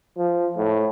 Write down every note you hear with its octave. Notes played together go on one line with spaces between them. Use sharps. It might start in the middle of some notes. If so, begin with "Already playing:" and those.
F3
A2